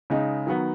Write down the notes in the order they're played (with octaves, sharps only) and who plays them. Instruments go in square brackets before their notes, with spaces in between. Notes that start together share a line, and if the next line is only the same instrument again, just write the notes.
[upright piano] C#3 G#3 D#4
D#3 F#3 B3